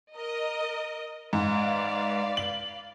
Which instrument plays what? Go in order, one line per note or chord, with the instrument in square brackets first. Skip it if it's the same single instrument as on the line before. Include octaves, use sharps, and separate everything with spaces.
[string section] A#4 D#5
[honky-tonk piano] G#2 [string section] B4 D5 F5
[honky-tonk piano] F#7